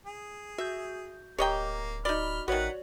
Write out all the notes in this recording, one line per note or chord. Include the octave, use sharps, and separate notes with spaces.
G#4
F#4 E5 G6
D1 A#3 G4 C#5 D#5 G5 A#5
D#4 F#4 D5 B5 F6 G7
A1 D#3 B3 F#4 B4 C#5 D5 F#5